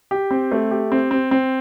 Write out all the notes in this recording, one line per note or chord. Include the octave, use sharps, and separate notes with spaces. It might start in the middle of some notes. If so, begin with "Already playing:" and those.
G4
C4
A3
G4
C4
C4
C4